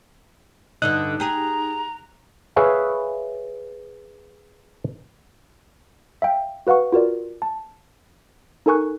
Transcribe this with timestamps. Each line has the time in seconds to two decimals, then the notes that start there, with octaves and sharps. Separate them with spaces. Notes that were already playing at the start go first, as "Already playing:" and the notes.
0.82 G2 D3 D#4 D#5 F#6
1.20 G4 G#4 A#5
2.56 G#4 B4 C#5 E5 F5 G#5
6.22 E5 F5 G5
6.67 F#4 B4 F5 F#5 C#6
6.92 F4 F#4 A#4 D5
7.42 A5
8.66 D#4 A4 A#4 G#5 C#6 F#6